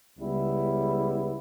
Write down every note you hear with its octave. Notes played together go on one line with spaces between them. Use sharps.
C#2 C#3 G3 B3 E4